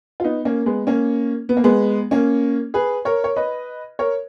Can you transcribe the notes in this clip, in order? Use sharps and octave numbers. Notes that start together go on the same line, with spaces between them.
F4
B3 D#4
A#3 C#4
G#3 B3
A#3 C#4
B3
A#3
G#3 B3
A#3 C#4
G#4 B4
A#4 C#5
C#5
B4 D#5
A#4 C#5